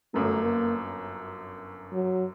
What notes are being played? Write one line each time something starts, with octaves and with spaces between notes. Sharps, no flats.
G1 F#2 F#3 A3
A#3
F#3